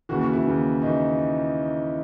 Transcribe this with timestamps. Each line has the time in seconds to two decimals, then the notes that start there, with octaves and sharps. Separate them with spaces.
0.09 D#2 C#3 E3 F#4
0.21 F#4
0.33 E4
0.45 D#2 C#3 E3
0.81 C#3 E3 D#4